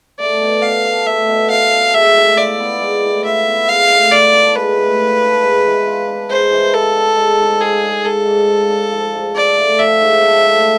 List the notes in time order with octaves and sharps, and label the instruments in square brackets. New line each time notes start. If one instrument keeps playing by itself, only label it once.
[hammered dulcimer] A3 [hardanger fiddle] D5
[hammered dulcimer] B2
[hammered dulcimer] B2 [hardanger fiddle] F5
[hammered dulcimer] D4
[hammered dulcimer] A3 [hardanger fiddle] E5
[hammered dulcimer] B2
[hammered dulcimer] B2 [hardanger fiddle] F5
[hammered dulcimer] D4
[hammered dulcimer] G#3 [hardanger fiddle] E5
[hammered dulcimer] A2
[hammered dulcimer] F4 [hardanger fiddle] D5
[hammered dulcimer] B3
G#3
A2
[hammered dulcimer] F4 [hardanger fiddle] E5
[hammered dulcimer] B3
[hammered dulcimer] G#3 [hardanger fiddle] F5
[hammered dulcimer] A2
[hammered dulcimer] F4 [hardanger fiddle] D5
[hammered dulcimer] D4
[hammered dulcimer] G#3 [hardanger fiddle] B4
[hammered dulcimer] A2
F4
D4
G#3
E3
F4
D4
[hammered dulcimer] G#3 [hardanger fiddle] C5
[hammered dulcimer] E3
[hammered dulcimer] F4 [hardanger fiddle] A4
[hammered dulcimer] D4
G#3
G#2
[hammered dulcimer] F4 [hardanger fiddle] G#4
[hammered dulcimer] D4
[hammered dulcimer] G#3 [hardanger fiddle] A4
[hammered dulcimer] G#2
F4
D4
F3
G#2
[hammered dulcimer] D4 [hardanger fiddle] D5
[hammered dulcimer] A3
[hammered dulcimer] F3 [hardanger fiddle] E5
[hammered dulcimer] G#2
D4
A3